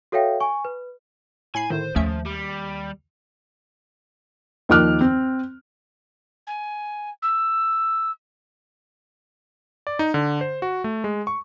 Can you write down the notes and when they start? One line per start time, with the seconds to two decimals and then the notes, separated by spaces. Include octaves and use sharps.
0.12 F#4 A4 C#5 E5 F5 G5
0.40 G#5 C#6
0.65 B4
1.55 A2 G#5 B5 C7
1.70 A2 D3 D#3 C5
1.96 D#2 F3 A3 C#4 E5
2.26 G3
4.69 D#2 D#3 F3 D6 F6 F#6
5.01 C4
6.46 G#5
7.22 E6
9.87 D5
9.99 D#4
10.14 D3
10.41 C5
10.62 F#4
10.84 A3
11.04 G#3
11.27 C#6